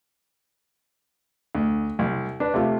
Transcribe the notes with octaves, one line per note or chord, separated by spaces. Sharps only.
D2
C2
D4 B4
C3 A3 F4